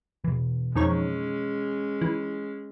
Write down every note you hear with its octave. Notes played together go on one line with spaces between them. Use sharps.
B2 E3
F2 D#3 G#3 C#4 C#5
E3